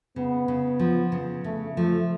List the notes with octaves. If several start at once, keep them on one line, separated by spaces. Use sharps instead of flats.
C#3 B3
C#3
F3
C#3
C#3 A3
F3 A3